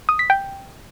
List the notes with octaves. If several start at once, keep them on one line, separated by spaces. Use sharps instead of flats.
D#6
B6
G5